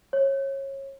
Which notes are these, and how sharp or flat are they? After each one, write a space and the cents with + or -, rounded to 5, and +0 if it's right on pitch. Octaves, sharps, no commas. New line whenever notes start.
C#5 -25